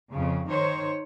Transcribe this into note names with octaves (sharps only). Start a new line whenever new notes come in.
F2 C#3
D#3 C5 C#5